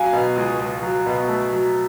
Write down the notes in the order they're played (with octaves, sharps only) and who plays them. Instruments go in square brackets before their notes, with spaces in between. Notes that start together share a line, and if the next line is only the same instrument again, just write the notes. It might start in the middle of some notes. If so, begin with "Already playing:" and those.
Already playing: [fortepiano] F#3 [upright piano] F5 G#5
[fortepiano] B2
C#2
C#2
F#3
B2
A3
F#3